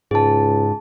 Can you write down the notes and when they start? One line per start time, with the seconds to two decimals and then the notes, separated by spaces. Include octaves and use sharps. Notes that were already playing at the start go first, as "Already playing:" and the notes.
0.11 C#2 G#2 G#4 A5